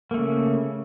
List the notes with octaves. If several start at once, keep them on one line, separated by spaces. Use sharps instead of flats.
C#3 A3 A#3